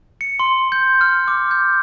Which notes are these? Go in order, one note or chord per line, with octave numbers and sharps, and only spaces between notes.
C#7
C6
G6
F6
D6
G6